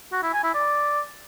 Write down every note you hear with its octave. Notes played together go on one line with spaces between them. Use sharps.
F#4
E4
G#5
E4
D5